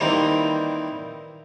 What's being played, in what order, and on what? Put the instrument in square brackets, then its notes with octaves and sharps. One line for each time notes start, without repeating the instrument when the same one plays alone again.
[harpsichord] D#3 E3 G3 A#3 C4